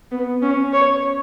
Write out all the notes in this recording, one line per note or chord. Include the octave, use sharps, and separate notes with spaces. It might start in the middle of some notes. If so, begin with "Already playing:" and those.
B3
C#4
C#5